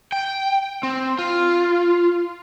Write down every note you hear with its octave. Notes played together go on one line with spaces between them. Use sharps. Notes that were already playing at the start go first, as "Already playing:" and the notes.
G5
C4
F4